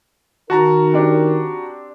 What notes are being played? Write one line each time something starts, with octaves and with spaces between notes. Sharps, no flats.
D#3 D#4 F#4 A#4 A5 A#5
C4 D4 G4